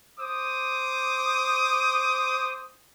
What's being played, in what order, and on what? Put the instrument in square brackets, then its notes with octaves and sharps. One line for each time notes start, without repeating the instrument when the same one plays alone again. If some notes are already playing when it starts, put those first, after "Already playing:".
[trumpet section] C5 D6 D#6